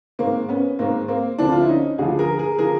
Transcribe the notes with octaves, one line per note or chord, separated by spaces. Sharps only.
G#2 D#3 A#3 C4
B3 C#4
G#2 D#3 A#3 C4
A#3 C4
D2 D3 F3 C4 D4
F4
E4
C#4 D#4
D2 D3 F3 F#4 G#4
G#4 A#4
G#4 A#4
D3 F3 G#4 A#4